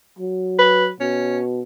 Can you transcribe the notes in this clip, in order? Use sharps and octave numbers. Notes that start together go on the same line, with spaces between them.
F#3
B4
B2 C#4